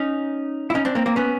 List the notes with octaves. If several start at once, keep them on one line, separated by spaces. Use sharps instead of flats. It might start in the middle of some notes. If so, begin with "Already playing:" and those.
Already playing: C#4 D#4
E4
C#4 D#4
C4 D4
A#3 C4
A#3 C4
B3 C#4